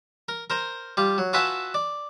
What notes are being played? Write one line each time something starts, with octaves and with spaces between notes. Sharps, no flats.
A#4
A#4 C5 A#5
G3 F4
F#3
F4 F#4 B4 E5 G#5 A5
D5